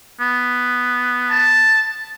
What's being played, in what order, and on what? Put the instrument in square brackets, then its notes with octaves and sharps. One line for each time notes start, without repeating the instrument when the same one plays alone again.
[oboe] B3
[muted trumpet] A5